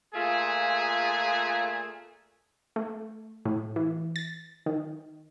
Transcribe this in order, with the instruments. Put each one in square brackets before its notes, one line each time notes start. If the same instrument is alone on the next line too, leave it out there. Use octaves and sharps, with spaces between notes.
[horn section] A#2 A3 F4 G#4
[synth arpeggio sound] A3
A2
E3
A6
D#3